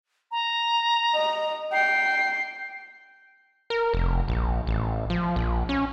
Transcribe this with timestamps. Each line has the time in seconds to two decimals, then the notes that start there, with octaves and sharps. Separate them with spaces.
0.31 A#5
1.15 D#5
1.73 G5 C7
3.70 A#4
3.94 F1
4.28 A#1
4.67 A1
5.10 F3
5.36 A#1
5.69 C#4